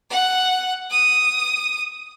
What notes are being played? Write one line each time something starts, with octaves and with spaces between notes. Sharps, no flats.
F#5
D#6